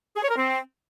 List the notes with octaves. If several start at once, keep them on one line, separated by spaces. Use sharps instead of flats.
G#4
C#5
A#4
C4